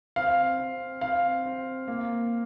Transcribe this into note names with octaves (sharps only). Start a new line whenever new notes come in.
C4 F5
C4
C4 F5
C4
A#3